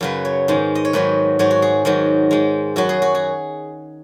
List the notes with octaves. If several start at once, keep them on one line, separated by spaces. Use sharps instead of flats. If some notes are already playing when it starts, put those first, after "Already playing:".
F#2 C#3 F#3 B4
C#5
G#2 D#3 G#3
D#5
C#5
G#2 D#3 F#3 B4
G#2 F#3 C#5
F#4
G#4
G#2 D#3 F#3
G#2 G#3
F#2 F#3 F#4
G#4
F#4
G#4